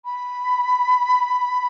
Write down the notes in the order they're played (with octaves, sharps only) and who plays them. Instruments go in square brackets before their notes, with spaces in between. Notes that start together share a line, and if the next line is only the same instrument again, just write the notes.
[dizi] B5